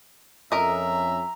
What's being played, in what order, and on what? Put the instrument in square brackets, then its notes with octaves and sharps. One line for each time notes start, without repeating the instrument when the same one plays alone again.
[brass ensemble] F2 C#4 [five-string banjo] A#4 D#5 [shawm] E5 [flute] A#5